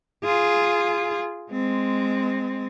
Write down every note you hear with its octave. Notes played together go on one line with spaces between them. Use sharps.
F4 G#4
G#3 C4